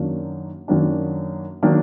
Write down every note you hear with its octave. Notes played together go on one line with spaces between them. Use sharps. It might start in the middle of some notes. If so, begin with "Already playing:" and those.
Already playing: F#2 D#3 F#3 A#3 D4
F#2 D#3 F#3 A#3 D4
D#3 F#3 A#3 D4